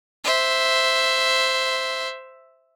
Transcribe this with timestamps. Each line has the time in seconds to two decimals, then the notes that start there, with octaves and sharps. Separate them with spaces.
0.24 C5 E5